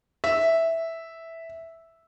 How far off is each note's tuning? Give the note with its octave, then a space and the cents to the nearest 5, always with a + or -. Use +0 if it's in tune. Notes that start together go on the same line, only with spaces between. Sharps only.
E5 -5